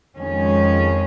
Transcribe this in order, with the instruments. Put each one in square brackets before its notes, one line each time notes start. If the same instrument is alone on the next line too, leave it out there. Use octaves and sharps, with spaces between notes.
[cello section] F2 D#3 G#3 C#4